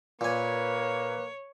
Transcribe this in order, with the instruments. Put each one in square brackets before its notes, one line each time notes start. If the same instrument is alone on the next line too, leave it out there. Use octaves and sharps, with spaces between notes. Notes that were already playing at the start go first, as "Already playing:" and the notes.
[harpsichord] A#2 G#5 [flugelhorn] A#3 [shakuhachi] B4 [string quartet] C#5